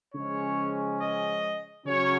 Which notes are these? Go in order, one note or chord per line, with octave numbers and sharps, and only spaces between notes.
C#3 F3 G#3 C#4 C#5
D#5
C#3 F#3 C#4 C#5